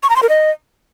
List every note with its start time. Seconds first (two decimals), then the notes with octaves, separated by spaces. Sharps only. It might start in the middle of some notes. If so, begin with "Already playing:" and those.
0.03 C#6
0.10 A#5
0.16 C6
0.23 A#4
0.29 D#5